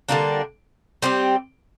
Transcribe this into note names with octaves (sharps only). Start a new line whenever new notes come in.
D3 G3 A#3 D4
G3 C4 G4